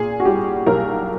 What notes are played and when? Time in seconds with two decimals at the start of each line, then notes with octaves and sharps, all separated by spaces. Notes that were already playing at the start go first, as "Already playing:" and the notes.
Already playing: A#2 G#4
0.20 F#4
0.25 G3 G4
0.66 B1 A#4